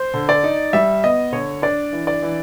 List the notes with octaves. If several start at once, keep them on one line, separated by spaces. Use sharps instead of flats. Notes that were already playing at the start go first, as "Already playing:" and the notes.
Already playing: C5
D3
D5
D#4
G3 E5
B3 D#5
D3 C#5
D4 D5
E3
D5
E3